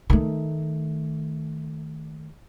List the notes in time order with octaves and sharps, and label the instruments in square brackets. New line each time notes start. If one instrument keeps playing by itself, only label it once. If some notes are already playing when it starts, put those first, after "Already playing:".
[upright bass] D#3 A3